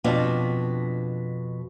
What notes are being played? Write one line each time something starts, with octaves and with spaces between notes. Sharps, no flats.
F2 B2 D4 F4